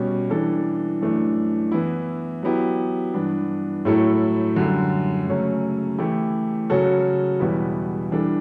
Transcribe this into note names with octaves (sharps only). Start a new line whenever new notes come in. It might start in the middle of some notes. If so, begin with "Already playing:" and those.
Already playing: B2 G3 C#4
E3 G3 D4 A4
F#2 E3 A3 D4
E3 B3 E4
F#3 B3 E4 G4
G2 E3 B3 D4
A2 F#3 A3 E4 A4
F#2 D3 G3
F#2 C#3 F#3 A3 C#4
E3 A3 E4 G4
C#3 F#3 C#4 F#4 A4
E2 B2 G3 B3 E4
E3 G3 D4 A4